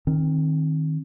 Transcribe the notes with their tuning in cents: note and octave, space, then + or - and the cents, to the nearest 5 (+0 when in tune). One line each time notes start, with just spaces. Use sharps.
D#3 +0 C4 +30